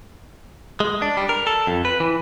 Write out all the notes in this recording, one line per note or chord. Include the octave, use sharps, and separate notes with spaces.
G#3
D4
G3
A#4
A4
F2
B4
E3